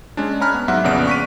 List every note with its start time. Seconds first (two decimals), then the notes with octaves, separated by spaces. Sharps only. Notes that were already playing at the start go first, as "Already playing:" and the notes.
0.17 G#3 C#4 D4
0.40 C#5 G#5 A#5 B5 F6 F#6
0.54 B3
0.68 G#2 F#3 E5 F#5 F6 F#6
0.84 A#1 F2 C#3 B3 D5 D7
1.07 C#6 B6 D#7